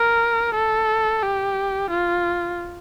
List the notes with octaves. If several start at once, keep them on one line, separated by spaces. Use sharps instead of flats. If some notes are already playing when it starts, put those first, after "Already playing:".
Already playing: A#4
A4
G4
F4